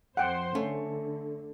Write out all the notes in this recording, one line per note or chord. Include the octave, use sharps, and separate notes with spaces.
F2 C5 F#5 G5 C6
D3 A3 C#4